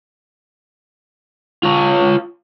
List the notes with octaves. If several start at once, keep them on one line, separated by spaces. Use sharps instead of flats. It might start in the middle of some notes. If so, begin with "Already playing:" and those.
F4 C#5